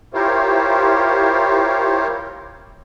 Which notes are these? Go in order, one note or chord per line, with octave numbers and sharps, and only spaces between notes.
E4 F4 G4 A#4 C5 C#5